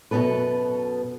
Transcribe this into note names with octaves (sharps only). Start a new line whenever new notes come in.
F#2 B2 D#3 B3 A4 B4